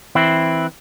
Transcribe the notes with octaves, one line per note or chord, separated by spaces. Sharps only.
E3 C4 E4